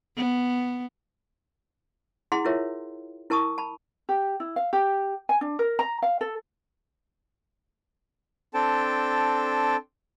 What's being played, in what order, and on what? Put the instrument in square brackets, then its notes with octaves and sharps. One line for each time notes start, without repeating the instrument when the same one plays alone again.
[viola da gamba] B3
[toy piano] E4 G#4 F#5 A#5 C6
E4 F4 A#4 C#5 E5
E4 A#4 A5 C#6 D#6
A5 B5
[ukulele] G4
E4
F5
G4
G#5
D4
A#4
A#5
F5
A4
[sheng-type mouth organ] C4 D4 A4 G5 A5